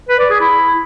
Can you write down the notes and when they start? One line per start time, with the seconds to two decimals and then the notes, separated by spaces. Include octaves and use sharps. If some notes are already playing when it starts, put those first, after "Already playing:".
0.09 B4
0.19 D5
0.30 G#4
0.41 E4